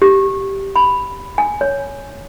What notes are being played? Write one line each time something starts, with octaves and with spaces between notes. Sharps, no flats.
G4
B5
G#5
C#5